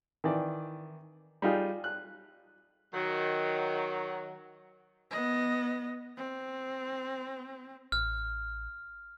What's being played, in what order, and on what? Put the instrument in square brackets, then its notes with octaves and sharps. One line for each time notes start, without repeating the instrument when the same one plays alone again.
[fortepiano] D#3 E3 D5
G3 D#4 F4 G#4
F#6
[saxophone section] D#3 F#3
[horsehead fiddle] B3 D#5
C4
[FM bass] A1 [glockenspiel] F6